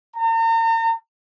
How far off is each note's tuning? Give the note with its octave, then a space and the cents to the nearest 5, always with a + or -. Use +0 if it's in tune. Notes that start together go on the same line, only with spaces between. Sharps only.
A#5 -40